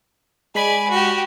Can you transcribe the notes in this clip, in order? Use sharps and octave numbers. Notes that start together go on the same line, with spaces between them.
G#3 D5 G#5 B5
F#4 G4